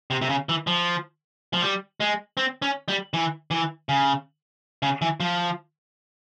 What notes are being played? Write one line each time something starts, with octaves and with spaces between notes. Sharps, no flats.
C3
C3
C#3
E3
F3
F3
G3
G#3
C4
C#4
G3
E3
E3
C#3
C#3
E3
F3